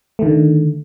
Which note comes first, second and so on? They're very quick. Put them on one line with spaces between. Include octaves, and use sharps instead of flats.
A3 D#3 D3